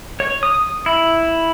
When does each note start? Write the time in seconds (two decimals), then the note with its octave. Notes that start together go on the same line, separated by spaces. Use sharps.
0.20 C#5
0.43 D#6
0.86 E4